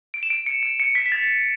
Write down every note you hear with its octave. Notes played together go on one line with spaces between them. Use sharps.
D7
E7
D7
C#7
D7
C#7
B6
B6
A6